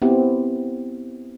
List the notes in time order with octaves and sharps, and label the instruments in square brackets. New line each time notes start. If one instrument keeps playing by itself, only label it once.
[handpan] B3 C4 E4 G4